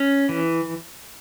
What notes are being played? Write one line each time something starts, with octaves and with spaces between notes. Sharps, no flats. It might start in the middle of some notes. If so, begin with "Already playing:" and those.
Already playing: C#4
E3